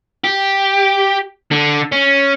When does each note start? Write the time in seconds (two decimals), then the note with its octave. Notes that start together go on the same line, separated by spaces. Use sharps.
0.24 G4
1.51 D3
1.92 C#4